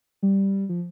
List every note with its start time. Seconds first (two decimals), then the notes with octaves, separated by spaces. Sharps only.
0.23 G3
0.69 F3